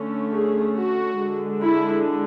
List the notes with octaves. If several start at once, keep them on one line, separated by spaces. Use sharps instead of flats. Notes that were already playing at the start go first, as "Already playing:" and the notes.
Already playing: D3 A3 C#4
G#4
F#4
D3 G#3 D4
E4